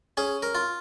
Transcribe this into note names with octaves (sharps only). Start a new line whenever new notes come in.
C#4 G#4
A#4
F4